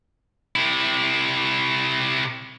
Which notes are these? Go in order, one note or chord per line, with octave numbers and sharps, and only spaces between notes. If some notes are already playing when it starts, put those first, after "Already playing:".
C3 E4